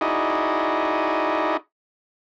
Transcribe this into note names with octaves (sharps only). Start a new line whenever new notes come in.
D#4 E4 F#4 G#4 D5 D#5